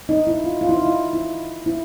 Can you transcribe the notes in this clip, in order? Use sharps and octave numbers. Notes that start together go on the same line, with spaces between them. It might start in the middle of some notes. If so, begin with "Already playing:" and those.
D#4
E4
F4
F4
E4
D#4
E4
E4
E4